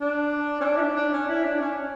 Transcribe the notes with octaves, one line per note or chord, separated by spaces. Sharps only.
D4
C#4
D4
E4
D4
D4
C#4
E4
D4
C#4